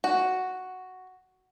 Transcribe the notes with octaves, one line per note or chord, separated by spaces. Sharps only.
F#4